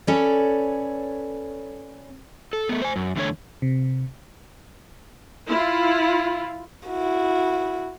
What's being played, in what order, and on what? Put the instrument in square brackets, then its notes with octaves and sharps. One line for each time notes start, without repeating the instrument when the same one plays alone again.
[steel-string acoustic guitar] C#4 A4 B4 C#5 D5
[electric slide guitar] A4
A3 B3
C5 G#5
F#2
E2 D3 A3 C#5
[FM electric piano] C3
[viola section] E4 F4
[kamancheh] E4 F#4